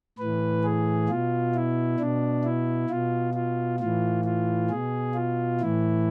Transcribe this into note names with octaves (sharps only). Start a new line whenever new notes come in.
A2 E3 B4
G#4
B2 F4
E4
B2 D4
E4
B2 F4
F4
A2 E3 F4
F4
B2 G#4
F4
A2 E3 E4